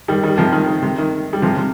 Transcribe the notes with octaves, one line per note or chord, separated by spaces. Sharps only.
D#3 G3
D#3 G3
C3 F3
D#3
D#3
C3
D#3
G3
C3 F3
C3